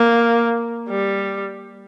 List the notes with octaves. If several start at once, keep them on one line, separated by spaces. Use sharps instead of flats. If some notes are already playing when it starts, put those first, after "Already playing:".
Already playing: A#3
G3